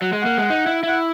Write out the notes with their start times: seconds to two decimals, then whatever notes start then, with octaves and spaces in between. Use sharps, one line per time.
0.02 F#3 F#5
0.13 G#3
0.22 A#3 F#5
0.38 G#3
0.50 D#4
0.66 E4
0.83 E4
0.89 F#5